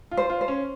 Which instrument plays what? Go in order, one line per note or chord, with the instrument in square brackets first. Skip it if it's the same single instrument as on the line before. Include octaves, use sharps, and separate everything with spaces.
[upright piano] F4
[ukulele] C5
[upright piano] F4
[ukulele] C5
[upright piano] C#4